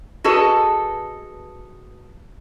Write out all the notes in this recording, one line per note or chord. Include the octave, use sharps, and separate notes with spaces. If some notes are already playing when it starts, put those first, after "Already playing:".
F#4 G#4 A4 B4 D#5